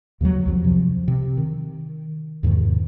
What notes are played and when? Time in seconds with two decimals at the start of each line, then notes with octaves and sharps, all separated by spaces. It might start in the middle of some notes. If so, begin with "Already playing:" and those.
0.21 D#2 C#3 F3 F#3
0.46 C2 F2 F3
0.64 C3 F3
1.08 C3
1.37 D#3
2.43 E2 G#2 C3 D#3